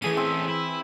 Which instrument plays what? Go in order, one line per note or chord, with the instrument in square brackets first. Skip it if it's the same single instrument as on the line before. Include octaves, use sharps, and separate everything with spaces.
[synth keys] E3 G#4 D#7 [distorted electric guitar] A3 C#4
[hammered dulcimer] C4
[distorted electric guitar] E4